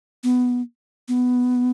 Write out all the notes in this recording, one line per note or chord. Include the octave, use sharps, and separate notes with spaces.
B3
B3